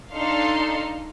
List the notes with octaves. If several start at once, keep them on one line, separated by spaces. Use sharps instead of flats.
D4 D#4 A4 D#5 F5 C6